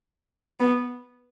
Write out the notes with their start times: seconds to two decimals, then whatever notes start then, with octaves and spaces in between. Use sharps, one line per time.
0.60 B3